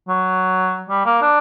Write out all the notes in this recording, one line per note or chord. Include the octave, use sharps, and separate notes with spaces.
F#3
G3
A#3
D4